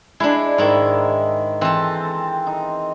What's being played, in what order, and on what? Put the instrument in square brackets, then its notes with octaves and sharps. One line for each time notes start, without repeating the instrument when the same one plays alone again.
[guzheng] G#3 D4 [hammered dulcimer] E4
[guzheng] G#2 E4 [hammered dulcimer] D#3 G#3
[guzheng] E3 A4 [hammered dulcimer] C4
[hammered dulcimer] D#4